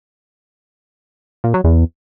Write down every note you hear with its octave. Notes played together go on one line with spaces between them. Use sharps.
A#2
F#3
E2